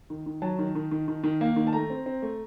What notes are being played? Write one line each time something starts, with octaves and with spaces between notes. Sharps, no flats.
D#3
D#3
F#3 A5
D#3
D#3
D#3
D#3
D#3
A#3
D#3
A5
A3 A#5
C4
C4
A3